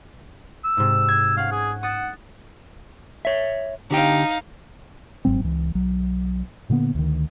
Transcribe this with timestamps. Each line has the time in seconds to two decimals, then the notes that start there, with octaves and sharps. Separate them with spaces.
0.64 E6
0.77 G#2 C3
1.08 G#6
1.37 C#4 F5 F#5
1.52 G#4
1.83 F#5 D#6 A6 E7
3.25 C#5 E5
3.91 D3 D#4 G4 F5 G5
5.25 G1 G#2 F#3 C4
5.44 C#2 E3
5.75 B1 F#3
6.70 A#2 D3 A#3 B3
6.95 D2 D#3